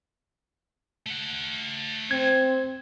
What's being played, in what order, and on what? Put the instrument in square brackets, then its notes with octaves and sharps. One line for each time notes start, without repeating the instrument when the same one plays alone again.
[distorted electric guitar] A3 F#5
[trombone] C4 [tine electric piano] G#6